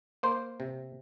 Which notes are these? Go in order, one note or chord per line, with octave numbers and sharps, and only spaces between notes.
A#3 C5
C3